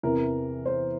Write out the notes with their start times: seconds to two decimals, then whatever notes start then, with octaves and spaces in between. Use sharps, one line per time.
0.03 E2 C3 E3 A#4
0.66 C5